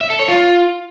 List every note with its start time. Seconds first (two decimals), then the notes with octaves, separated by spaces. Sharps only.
0.01 E5
0.10 A4
0.19 C#5
0.28 F4